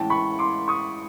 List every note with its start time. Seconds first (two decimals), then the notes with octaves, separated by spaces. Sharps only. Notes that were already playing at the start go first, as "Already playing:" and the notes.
Already playing: A1 A2 E3 G#3 C#4 G5 A5
0.10 B5 C#6
0.39 C6 D6
0.68 C#6 D#6